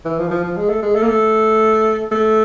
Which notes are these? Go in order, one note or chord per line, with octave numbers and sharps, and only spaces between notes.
E3
F3
E3
F3
F3
G#3
A3
G#3
A3
A#3
A3
A3